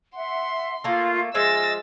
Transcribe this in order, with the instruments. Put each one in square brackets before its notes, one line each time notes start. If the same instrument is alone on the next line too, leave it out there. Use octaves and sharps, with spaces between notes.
[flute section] E5 F#5 [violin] C6
[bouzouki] A3 A#3 [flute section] F4
[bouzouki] F3 G#3 E5 [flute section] D#5 [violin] E6 A6